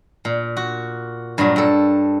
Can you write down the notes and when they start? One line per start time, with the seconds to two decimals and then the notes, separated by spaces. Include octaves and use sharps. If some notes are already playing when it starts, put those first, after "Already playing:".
0.25 A#2
0.57 F#4
1.38 G2 A#2 F#3
1.56 G2 A4